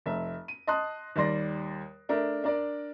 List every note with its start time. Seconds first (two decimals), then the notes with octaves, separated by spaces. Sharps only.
0.06 F1 E5
0.48 D#7
0.67 D#5 A5 C6 D#6 F#6
1.16 D#2 G3 D5 C6 A#6
2.09 A3 D4 A#4
2.44 D4 A#4 D5